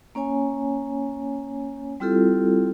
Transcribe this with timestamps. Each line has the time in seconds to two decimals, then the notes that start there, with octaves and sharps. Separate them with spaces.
0.15 A#3 C#4 C#5 G#5
2.00 G3 C4 E4 F4 G4 A4